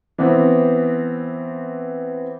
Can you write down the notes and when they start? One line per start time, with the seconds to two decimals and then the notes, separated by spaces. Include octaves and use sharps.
0.18 E3 B3 C4